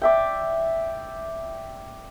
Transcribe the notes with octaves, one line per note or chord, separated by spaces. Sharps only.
D5 E5 G5